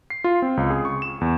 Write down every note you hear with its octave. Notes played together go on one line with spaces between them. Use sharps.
C7
F4
C4
C#2
G#4
C#6
E7
E2